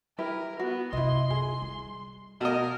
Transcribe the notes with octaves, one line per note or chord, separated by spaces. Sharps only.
E4 G4 A#4 B4
B3 F#4
F#2 C3 E4 D#5 C6
E4 G#4
G3
B2 A#4 D#5